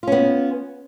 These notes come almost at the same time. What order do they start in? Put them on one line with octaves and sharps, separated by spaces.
F4 C#4 B3